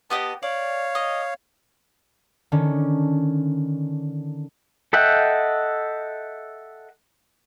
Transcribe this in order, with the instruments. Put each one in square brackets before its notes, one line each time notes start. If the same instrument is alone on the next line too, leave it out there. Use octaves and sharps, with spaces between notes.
[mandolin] B3 G4 D#5 [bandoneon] A5
[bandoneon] C#5 F5 [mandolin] D5
[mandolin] D#5
[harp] D3 D#3 C#4
[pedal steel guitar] A4 D#5 E5 F#5 G5